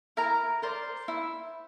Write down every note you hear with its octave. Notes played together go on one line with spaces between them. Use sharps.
E4 A#4 A#5
A#4 C5 D5 C6
E4